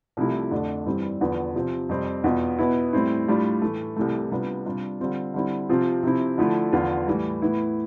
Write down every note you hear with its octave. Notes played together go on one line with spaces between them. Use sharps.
C2 C3 F3 A3 E4
F2 D3 A3 D4
G2 E3 G3 C4
E2 D3 F3 B3
C3 F3 C4
F2 C3 G3 C4
E2 B2 B3 F4
B2 B3 E4
A2 G3 C4 E4
A2 G3 D4 F4
A2 E3 A3
C2 C3 E3 A3
C3 G3 B3 D4 F4
C3 G3 D4 F4
D3 G3 C4 F4
D3 G3 C4 E4
C3 F3 C4 F4
C3 F3 C4 E4
D3 F3 A3 E4
E2 D3 F3 B3 F4
A2 E3 G3
A2 E3 B3 E4